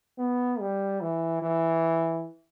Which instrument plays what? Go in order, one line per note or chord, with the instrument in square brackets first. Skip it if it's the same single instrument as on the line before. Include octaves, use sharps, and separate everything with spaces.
[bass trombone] B3
G3
E3
E3